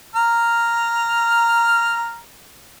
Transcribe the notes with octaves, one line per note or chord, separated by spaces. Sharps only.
A#5 F6